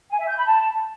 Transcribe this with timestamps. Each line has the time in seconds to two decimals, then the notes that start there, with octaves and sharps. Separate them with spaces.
0.10 G#5
0.19 E5
0.28 G6
0.37 B5
0.46 A5